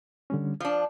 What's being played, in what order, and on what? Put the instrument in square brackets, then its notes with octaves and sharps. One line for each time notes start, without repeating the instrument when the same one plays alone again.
[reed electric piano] D3 G3 C#4
[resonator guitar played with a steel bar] F3 D4 [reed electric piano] F5